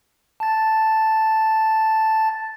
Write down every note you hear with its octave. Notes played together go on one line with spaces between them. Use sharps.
A5 A6